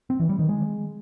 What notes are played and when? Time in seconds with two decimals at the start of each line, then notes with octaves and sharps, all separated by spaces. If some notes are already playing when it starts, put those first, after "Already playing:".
0.10 C4
0.20 E3
0.29 G3
0.39 D#3
0.49 G#3